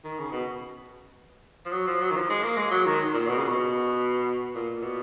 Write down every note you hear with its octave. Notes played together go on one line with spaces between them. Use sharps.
D#3
C#3
B2
F3
F#3
F3
F#3
D#3
F3
G#3
A#3
G#3
F#3
D#3
A#2
B2
C#3
B2
A#2
B2